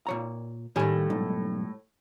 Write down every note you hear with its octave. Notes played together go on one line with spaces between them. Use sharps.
A#2 C#5 A#5
A2 D#3 G3 G4 G#5
B1 G#2